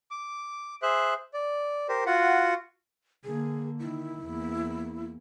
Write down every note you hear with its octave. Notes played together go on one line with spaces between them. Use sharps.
D6
G#4 C5 E5 F#6
D5
G4 A#4 C5
F4 F#4 F#5
D3 A#3 G#4
D#3 E4
E2 A#3